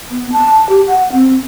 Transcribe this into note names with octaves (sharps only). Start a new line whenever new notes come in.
B3
A5
G4
F#5
C4